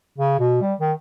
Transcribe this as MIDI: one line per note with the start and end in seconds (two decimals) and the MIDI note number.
0.18 0.39 49
0.39 0.60 47
0.62 0.74 55
0.80 0.92 51